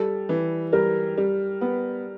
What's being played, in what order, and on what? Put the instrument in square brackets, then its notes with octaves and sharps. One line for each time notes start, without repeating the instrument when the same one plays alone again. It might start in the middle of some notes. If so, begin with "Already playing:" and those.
Already playing: [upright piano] G3 [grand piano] A4
[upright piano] E3
[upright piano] G3 [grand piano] A#4
[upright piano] G3
B3